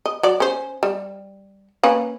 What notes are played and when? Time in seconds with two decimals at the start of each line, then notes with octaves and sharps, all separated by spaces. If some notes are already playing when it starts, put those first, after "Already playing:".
0.06 D#5
0.23 F#3 D5
0.40 C#4 C5
0.83 G3
1.83 A#3 C#4 B4